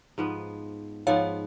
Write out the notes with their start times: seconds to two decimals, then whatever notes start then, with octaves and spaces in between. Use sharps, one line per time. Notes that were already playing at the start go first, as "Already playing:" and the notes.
0.18 G#2 F3 B3
1.07 G#2 F3 B3 C#5 F5